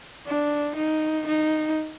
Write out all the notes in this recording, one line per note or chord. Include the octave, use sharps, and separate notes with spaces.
D4
D#4
D#4